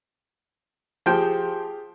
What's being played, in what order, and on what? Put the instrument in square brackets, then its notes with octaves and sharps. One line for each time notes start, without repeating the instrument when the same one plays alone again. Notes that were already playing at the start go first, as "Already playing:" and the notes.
[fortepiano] F3 G5 [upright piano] G4 G#4